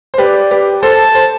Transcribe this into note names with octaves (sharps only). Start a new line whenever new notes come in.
C5
G4 B4 D5
G4 B4
A4 C5 A5
C5